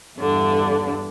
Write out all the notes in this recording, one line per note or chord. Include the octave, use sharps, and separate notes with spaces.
E2 G2 D3 D4